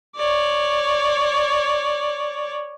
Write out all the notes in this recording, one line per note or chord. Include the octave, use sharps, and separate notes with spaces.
C#5 D5